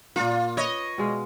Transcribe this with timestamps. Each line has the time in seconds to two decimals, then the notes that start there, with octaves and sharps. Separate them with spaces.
0.16 A#2 A#3 F4
0.57 B4 C#5 D#5
0.98 B2 G#3 F5